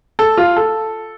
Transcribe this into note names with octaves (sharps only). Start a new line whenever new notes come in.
A4
F4
A4